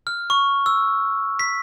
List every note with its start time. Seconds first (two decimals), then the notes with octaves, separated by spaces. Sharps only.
0.07 F6
0.30 C#6
0.66 E6
1.39 B6